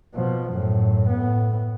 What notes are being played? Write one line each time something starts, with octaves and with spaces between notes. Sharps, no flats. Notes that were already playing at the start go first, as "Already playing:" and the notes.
B2 F3
F#2 A2
A2 B3